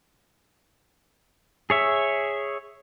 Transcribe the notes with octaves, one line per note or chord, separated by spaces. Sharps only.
G#4 C#5 E5